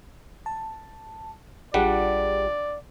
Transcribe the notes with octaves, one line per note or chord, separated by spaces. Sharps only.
A5
A1 G3 D4 F4 G#4 D5 F#5